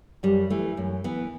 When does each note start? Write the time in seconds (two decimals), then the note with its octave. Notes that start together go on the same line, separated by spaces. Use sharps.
0.23 F#2 G3
0.50 E3 A3
0.77 F#2
1.04 E3 B3